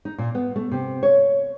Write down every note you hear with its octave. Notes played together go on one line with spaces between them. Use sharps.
D#4
A#2
B3
A3
C3
C#5